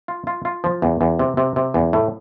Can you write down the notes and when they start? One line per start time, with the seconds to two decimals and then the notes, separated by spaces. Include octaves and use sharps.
0.08 F4
0.27 F4
0.45 F4
0.64 F3
0.82 E2
1.01 E2
1.19 C3
1.37 C3
1.56 C3
1.74 E2
1.93 A2